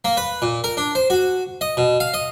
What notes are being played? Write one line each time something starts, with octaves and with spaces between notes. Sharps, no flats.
A#3
B4
A#2
A#4
D4
C5
F#4
D#5
B2
F5
D#5